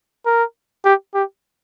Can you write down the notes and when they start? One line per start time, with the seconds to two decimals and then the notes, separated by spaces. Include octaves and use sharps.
0.26 A#4
0.85 G4
1.14 G4